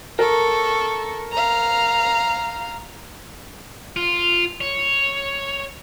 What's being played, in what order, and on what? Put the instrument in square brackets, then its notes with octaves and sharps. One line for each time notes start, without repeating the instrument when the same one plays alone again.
[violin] A4 C#6 [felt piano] A#4
[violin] F5 A#5
[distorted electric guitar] F4
C#5